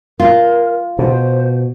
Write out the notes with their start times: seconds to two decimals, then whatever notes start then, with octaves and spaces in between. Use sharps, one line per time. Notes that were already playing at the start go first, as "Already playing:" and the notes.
0.20 F4 A#4
0.99 B2 C5